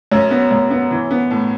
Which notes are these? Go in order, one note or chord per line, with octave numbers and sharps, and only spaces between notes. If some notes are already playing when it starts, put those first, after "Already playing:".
F#2 C#4
B3
F#2
B3
E3
B3
A2